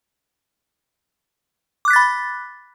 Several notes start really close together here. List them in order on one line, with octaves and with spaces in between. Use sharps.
D6 F#6 B6 A6 B5